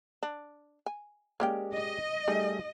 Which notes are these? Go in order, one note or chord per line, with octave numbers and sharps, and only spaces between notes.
D4
G#5
G#3 A#3 C#4 G4 D5 G5
D#5
G3 A3 D#4 G#4